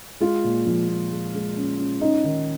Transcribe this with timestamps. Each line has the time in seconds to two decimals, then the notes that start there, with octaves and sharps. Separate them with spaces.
0.20 G#3 F4
0.44 A#2
0.66 F3
0.89 A#2
1.11 G#3
1.34 G#3
1.56 C#4
1.79 C#4
2.01 C#4 D#4
2.24 D#3